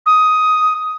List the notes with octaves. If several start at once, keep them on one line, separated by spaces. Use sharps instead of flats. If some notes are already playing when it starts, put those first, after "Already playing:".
D#6